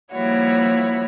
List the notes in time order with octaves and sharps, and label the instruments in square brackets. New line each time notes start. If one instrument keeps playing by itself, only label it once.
[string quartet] F3 G3 A#3 E4 F#4 C#5